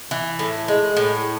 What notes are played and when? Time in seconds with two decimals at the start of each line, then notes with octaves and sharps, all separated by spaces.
0.11 E3
0.39 A2
0.68 G#3
0.97 A2